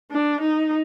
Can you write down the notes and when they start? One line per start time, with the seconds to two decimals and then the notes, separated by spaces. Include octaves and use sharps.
0.11 D4
0.41 D#4